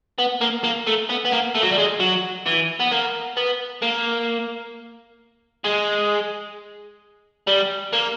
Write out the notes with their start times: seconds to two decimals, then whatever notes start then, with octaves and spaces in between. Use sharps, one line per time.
0.18 B3
0.41 A#3
0.64 A#3
0.87 A3
1.09 B3
1.25 B3
1.32 A#3
1.55 A3
1.62 F#3
1.71 G3
1.78 G#3
2.00 F#3
2.46 E3
2.80 B3
2.92 A#3
3.37 B3
3.82 A#3
5.64 G#3
7.47 G3
7.93 A#3